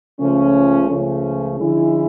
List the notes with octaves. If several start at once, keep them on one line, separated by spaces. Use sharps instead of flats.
C#2 C#3 F3 A3 C#4
C#2 C#3 F3 A3 C#4
D3 F3 G#3 C#4 E4